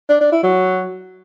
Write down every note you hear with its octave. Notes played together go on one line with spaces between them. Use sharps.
D4
D4
E4
F#3